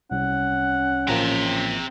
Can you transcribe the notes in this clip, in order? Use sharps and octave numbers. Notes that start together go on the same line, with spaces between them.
C2 C#4 F#5
A1 F3 A#3 C4 A#5